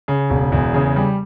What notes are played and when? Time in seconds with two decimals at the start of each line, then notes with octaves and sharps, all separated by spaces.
0.08 C#3
0.30 E1
0.52 E2
0.74 C#3
0.96 G3